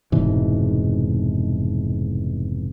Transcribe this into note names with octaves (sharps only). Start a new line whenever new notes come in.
F1 G#2 B2 E3